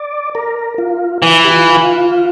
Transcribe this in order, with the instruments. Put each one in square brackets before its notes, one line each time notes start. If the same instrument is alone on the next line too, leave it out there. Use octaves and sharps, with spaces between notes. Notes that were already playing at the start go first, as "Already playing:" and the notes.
Already playing: [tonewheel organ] D5
A#4
F4
[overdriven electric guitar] E3 [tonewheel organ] E4
[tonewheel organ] G4
F4
F4